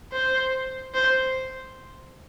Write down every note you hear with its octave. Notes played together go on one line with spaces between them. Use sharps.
C5
C5